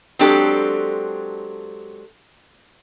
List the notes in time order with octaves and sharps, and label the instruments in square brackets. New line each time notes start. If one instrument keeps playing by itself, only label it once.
[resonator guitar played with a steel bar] F#3 G#3 C4 D4 G4 A4